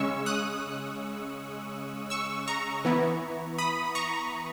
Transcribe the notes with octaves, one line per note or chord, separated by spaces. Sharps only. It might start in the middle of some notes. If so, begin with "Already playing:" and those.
Already playing: C#3 G#3 C#4 C#6 E6
D#6 F#6
C#6 E6
A#5 C#6
E3 B3 E4
B5 D#6
A#5 C#6